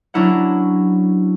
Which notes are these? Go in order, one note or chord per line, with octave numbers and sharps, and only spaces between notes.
F#3 C#4 D4 E4 A#4 F#5